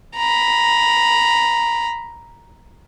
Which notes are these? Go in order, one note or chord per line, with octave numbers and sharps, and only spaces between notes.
A#5 B5